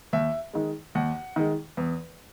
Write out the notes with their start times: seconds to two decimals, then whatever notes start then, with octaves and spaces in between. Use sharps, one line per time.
0.13 D#2 E5
0.53 D#3 G#3
0.95 D#2 F#5
1.36 D#3 G#3
1.77 E2